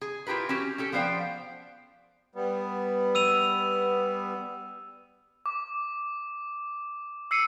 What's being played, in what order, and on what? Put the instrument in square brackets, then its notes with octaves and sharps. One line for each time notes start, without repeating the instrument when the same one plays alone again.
[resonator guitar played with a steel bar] G#4
E4 F4 G4 A#4 B4
C#4 F#4 G4
C#4 G4 A4
F3 B3 C5 D5 F5 G5
[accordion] G3 B3
[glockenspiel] E6 D#7 F7
[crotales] D6
E6 C7 C#7 D#7